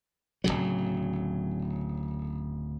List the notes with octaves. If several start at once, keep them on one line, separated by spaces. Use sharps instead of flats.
D1 B1 C#3 F#3